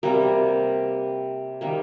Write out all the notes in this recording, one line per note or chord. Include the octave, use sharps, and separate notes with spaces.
C3 G3 A#3 A#4
D#3 G3 A#3